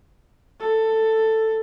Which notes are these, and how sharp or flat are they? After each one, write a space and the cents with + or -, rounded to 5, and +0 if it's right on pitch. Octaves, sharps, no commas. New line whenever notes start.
A4 +10